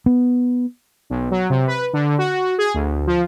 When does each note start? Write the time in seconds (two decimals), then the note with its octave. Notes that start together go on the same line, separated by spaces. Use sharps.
0.06 B3
1.10 B1
1.31 F#3
1.50 C3
1.67 B4
1.93 D3
2.18 F#4
2.58 G#4
2.74 D2
3.07 F3